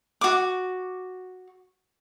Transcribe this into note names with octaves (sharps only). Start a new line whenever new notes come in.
F#4 D6